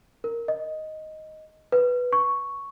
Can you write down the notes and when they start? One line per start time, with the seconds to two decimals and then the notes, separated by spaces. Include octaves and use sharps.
0.24 A#4
0.48 D#5
1.72 B4
2.13 C#6